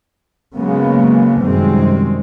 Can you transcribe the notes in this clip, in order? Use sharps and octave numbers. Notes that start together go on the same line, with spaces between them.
C#3 F#3 G#3 A#3 B3
F#2 C3 D#3 G3 G#3 C4